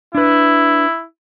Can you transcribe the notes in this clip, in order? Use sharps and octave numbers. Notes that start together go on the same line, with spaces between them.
D4 E4 B4